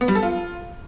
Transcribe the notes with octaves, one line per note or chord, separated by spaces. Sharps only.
B3
G3
A4
F4